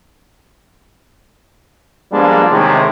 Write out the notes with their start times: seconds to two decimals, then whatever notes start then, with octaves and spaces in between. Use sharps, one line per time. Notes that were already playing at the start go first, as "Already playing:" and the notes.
2.12 F3 G3 G#3 A#3 B3 D4
2.50 A2 C3 D#3 E3 G#3